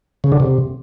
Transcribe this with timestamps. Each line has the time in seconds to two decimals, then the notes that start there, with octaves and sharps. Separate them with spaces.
0.24 C#3
0.32 D3
0.40 C3